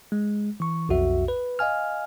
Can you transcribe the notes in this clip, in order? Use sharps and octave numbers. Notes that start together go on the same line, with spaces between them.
G#3
E3 C#6
B1 F2 F#4 E5
B4
D#5 F5 G#5 F6